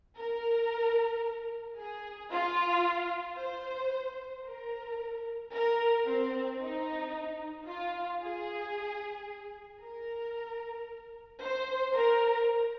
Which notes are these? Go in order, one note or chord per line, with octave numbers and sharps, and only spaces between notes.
A#4
G#4
F4
C5
A#4
A#4
C4
D#4
F4
G#4
A#4
C5
A#4